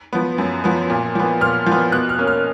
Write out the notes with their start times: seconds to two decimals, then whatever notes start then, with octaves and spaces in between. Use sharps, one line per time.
0.13 F3 B3
0.38 F#2
0.64 F3 B3
0.90 A#2
1.15 F3 B3
1.41 A#2 F6
1.66 F3
1.71 B3
1.92 B2 F#6
2.09 F6
2.18 A#3 C#4
2.27 F6